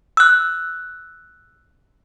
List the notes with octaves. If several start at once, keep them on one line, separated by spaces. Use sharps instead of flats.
E6 F#6